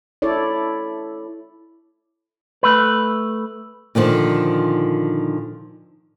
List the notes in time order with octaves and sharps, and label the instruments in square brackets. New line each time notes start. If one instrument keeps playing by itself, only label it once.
[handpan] E4 A4 C#5 D5
[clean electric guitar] A3 B4
[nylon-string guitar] A#2 D3 D#3 F3